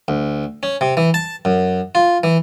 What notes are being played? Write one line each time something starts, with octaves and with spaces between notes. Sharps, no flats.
D2
C#4
C3
E3
A5
F#2
F4
E3